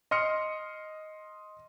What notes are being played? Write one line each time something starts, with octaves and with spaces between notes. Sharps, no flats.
D#5 C6 F6 C#7